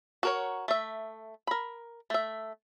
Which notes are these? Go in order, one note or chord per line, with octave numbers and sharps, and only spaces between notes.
F#4 A#4 C#5
A3 E5
A#4 B5
A3 E5